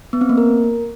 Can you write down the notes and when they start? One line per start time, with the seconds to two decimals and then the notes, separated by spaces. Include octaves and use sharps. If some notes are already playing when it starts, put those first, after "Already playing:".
0.13 B3
0.21 C4
0.29 A#3
0.38 A#4